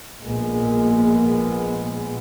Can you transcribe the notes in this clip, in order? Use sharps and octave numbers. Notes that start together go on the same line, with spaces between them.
A#1 A#2 G#3 B3